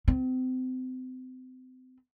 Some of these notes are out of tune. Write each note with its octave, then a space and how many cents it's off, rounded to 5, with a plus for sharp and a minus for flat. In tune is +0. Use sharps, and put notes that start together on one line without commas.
C4 -35